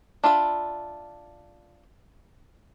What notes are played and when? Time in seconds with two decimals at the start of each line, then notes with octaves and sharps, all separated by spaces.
0.24 D4 F4 E5 B5